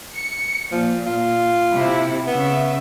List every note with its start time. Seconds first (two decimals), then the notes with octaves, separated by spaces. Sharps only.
0.15 C#7
0.72 A#2 F3
1.06 F4
1.74 C3 E4
2.27 C#3 B3 E5